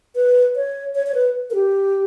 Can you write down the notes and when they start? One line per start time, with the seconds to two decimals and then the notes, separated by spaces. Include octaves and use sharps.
0.15 B4
0.56 C#5
0.95 C#5
1.07 C#5
1.14 B4
1.50 A#4
1.54 G4